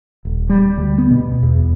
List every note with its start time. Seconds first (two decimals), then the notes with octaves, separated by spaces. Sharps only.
0.25 D#1
0.49 G3
0.77 D2
0.98 B3
1.11 B2
1.43 E2